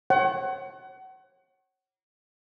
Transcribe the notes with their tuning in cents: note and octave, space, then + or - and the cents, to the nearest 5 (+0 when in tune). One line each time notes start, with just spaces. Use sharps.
C#5 -30 F#5 +30